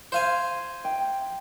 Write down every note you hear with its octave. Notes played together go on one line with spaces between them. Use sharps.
C5 F5 G#5
G5